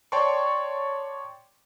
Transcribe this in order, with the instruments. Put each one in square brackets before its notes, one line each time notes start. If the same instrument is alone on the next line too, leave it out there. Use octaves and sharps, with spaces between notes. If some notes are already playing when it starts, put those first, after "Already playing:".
[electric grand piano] C#5 D5 G5 A5 C6 C#6